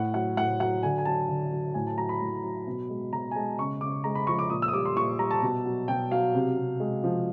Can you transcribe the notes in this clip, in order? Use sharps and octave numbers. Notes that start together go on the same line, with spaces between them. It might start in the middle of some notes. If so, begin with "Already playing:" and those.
Already playing: A2 F#5
F#3 F#5
A2 F#5
F#3 F#5
D3 G#5
G#5
F#3 A5
D3
F#3
A2 G#5
A5
F#3 A#5
B5
A2
F#3
B2
G#3
B2 A#5
G#5
G#3 A5
C#3 C#6
C#3 D6
G#3 A#5
B5
F3 C#6
D6
A#2 D#6
E6
D#6
G3 D6
C6
A#2 C#6
G3 A#5
A5
B2
F#3
B2 G5
F#3 F5
C3
C3
G#3
F3